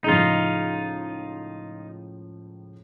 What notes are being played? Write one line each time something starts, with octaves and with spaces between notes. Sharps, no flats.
C#2 A2 F3 D#4 F4